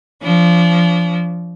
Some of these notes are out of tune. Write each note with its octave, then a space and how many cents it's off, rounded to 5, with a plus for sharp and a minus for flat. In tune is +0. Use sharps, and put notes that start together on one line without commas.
F3 -20 D4 -35